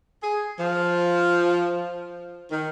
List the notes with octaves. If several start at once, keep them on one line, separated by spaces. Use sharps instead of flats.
G#4
F3
D#3